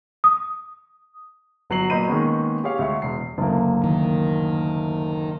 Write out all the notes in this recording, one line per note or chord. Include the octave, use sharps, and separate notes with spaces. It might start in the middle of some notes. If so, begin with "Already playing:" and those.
D#6
G1 F#3 B4 C7 F#7
A#2 F#3 D#5 B5 G6 D#7
D#3 G#3 A#3 B3 C#4
G4 G#4 C#5 F5
D2 G#3 E5 C#6
E1 C7
F#1 D2 A#3
D#3